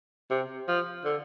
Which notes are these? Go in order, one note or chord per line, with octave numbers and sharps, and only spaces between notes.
C3
F3
D3